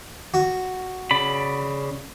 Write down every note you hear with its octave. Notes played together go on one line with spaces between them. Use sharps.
F#4
C#3 D5 B5